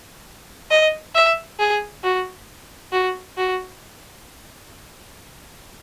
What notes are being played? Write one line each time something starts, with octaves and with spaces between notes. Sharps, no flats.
D#5
E5
G#4
F#4
F#4
F#4